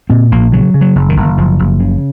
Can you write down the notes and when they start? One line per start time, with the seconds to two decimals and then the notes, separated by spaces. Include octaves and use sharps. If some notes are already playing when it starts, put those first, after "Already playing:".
0.10 A#2 C4
0.32 A#1 A#3
0.52 C#3 F#3
0.74 C#3
0.81 F#3
0.95 F#1
1.09 D#3
1.16 F#1
1.37 F#1 F3
1.59 F#1
1.80 C#3